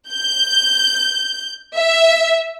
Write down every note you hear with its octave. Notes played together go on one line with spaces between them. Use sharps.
G6
E5